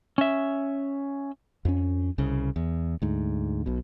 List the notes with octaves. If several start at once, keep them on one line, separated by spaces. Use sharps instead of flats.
C#4 E5
F2 C#4
C2 C#3
E2
D2 G#2
B1 B2